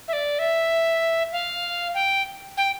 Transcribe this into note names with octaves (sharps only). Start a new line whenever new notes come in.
E5
D5
E5
F5
G5
G5